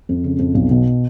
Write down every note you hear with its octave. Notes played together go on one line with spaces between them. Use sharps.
F2
C#3
F2
B1
B2